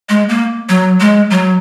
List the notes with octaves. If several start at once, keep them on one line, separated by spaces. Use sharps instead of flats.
G#3
A#3
F#3
G#3
F#3